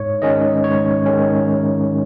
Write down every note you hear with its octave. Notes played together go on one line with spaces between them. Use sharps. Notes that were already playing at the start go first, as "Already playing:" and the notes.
Already playing: G#2 C#5
D#3 G#3 C#4 D#5
G#2 C#5
D#3 G#3 C#4